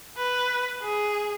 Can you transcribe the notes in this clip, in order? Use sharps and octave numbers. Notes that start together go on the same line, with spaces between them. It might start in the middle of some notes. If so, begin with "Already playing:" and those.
B4
G#4